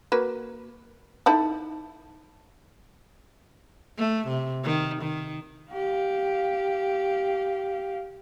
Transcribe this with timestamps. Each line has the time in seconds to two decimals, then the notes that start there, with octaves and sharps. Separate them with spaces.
0.12 A#3 F#4 B4
1.26 D#4 E4 A4
3.98 A3
4.28 C3
4.64 D#3
5.02 D#3
5.72 G4 F5